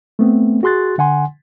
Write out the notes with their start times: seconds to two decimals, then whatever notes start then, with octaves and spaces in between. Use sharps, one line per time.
0.19 A3 B3 C4
0.63 F#4 G#4 C6 F#6 A6
0.98 D3 F#5 G#5 C6